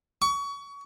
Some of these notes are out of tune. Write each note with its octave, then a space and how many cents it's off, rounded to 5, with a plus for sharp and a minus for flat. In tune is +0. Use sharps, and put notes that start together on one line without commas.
C#6 +30